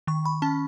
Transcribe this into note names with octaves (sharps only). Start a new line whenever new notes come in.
D#3 C#6
B5
C#4 A5